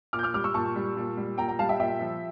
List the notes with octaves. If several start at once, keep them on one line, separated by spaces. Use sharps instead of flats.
A#2 D6 F6
G6
D6 F6
G3 D6 F6
C#6 E6
A#2 A5 C#6
G3
A#2
G3
A#2 G5 A#5
G5 A#5
G3 F5 A5
E5 G5
A#2 E5 G5
F3